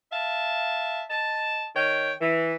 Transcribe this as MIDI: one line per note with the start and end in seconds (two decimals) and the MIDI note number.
0.12 1.03 76
0.12 1.03 77
0.12 1.03 81
1.10 1.64 75
1.10 1.64 81
1.76 2.12 51
1.76 2.12 73
1.76 2.12 79
2.20 2.55 52